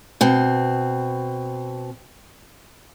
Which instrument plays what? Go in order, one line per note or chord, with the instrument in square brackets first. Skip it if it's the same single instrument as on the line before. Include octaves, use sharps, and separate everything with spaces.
[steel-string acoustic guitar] B2 C4